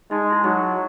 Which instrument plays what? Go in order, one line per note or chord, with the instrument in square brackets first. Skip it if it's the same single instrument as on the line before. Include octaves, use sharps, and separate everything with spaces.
[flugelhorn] G#3 [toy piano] D#4
[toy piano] E4
[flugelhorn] F#3 [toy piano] D#4